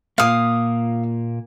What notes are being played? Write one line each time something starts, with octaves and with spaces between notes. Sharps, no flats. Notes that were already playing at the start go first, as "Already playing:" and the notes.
A#2 A#3 F5 D#6